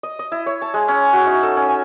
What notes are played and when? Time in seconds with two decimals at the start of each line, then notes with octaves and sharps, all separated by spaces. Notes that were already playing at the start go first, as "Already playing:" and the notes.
0.03 D#5
0.19 D#5
0.32 E4
0.46 C#5
0.62 A5
0.74 G#3
0.88 C#4
1.13 F#4
1.27 D#4
1.43 A4
1.57 C#4
1.68 G#5